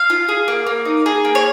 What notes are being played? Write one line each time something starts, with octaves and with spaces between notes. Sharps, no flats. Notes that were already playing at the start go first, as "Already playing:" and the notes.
Already playing: F5
F4
G#4
A#3
A#3
D#4
G#4
A#3
C#5